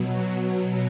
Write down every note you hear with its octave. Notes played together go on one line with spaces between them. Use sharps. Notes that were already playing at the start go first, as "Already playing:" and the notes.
Already playing: B2 F#3